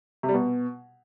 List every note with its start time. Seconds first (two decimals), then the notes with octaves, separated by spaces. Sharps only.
0.23 C3
0.29 G3
0.34 B2